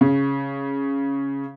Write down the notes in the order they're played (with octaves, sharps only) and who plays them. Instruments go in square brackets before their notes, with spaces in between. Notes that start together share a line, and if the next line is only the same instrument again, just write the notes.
[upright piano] C#3